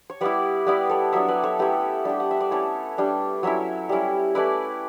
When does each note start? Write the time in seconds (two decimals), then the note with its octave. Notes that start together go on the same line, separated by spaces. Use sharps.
0.10 C#5
0.21 G3 B3 E4 B4 D5
0.67 G3 B3 E4 B4 D5
0.89 A4 C#5
1.12 F#3 B3 D4 C#5 E5
1.28 B4 D5
1.44 A4 C#5
1.59 A3 C#4 E4 G4 B4
2.05 G3 D4 G5
2.20 F#5
2.31 E5
2.40 D5
2.51 A3 C#4 E4 A4 C#5
2.98 G3 D4
3.43 F#3 C#4 E4 C#5 E5
3.89 G3 C#4 E4
4.35 A3 C#4 E4 B4 D5